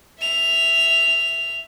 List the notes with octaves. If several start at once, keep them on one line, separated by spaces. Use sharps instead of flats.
E5 F7